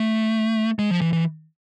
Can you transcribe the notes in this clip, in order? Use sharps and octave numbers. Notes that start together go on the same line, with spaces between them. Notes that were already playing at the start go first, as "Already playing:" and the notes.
Already playing: A3
G#3
F3
E3
E3